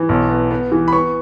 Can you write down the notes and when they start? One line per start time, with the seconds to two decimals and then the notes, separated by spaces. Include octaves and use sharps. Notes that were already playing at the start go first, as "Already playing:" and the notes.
Already playing: E3
0.09 B1
0.30 B3
0.51 B3
0.72 E3
0.88 B5
0.93 B3 C#6